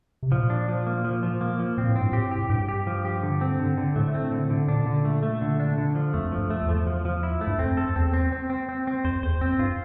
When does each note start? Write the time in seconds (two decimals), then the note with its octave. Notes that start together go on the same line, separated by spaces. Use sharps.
0.23 C3
0.32 A#2 F3
0.50 D4
0.68 F3
0.87 A#3
1.04 F3
1.23 F3
1.41 A#3
1.59 F3
1.78 A#2 C4
1.89 A2
1.96 G2 C4
2.12 A2 G4
2.31 G4
2.38 A2
2.50 G2 G4
2.69 G4
2.87 F3
3.05 G4
3.23 D3
3.41 C4
3.60 D3
3.78 D3
3.96 A2 A3
4.14 C4
4.32 D3
4.50 D3
4.68 A#2 D4
4.86 D3
5.05 A3
5.23 A3
5.42 D3
5.60 D4
5.78 D3
5.95 F3
6.14 F2 A3
6.32 F3
6.38 G2
6.50 A3
6.62 E2
6.69 F3
6.87 F3
7.05 F3
7.23 E4
7.41 A3
7.47 G2
7.59 F2 C4
7.77 A4
7.96 E2 C4
8.13 C4
8.32 C4
8.50 C4
8.69 C4
8.87 C4
9.05 F2 C5
9.23 E2 C5
9.41 F2 C4
9.59 G2 F4